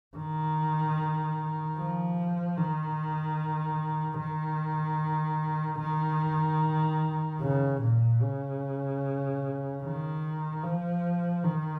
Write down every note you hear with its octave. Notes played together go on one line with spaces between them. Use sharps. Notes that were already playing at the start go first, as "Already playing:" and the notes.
D#3
F3
D#3
D#3
D#3
C#3
A#2
C#3
D#3
F3
D#3